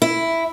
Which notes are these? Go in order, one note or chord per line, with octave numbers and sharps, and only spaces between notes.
E4